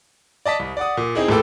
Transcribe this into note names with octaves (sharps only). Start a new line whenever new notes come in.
D5 D#5 A5 B6
C2
D5 F#5 D#6
A#2
C4 D#4 E4 G#4
A1 A#2 A3 A4 G5 E6